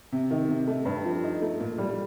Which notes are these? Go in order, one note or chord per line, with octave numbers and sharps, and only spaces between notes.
C3
D#3
C3
A3
G2
F3
D#4
A3
A#2
G3